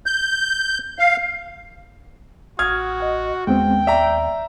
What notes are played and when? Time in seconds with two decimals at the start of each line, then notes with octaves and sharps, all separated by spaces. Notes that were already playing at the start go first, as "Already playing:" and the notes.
0.06 G6
0.99 F5
2.59 A1 F#4 D#6 F6 G#6
3.01 D#5 F#5
3.47 D#2 G#3 B3 C4 G5
3.87 D5 E5 A#5